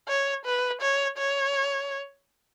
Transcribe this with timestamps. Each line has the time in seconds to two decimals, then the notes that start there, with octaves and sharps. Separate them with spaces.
0.08 C#5
0.46 B4
0.82 C#5
1.18 C#5